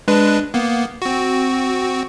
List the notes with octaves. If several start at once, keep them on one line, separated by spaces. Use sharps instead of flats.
G#3 D4 B4
A#3 B3
C4 F#4